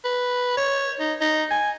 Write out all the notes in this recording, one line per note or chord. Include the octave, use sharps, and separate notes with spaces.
B4
C#5
D#4
D#4
G#5